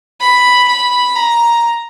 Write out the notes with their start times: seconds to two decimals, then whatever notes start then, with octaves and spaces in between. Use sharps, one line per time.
0.21 B5
0.68 B5
1.16 A#5